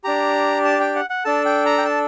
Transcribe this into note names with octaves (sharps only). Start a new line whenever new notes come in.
D4 G4 A#5
A5
G5
F#5
F#5
D4 A4 A5
G5
A#5
G5
A5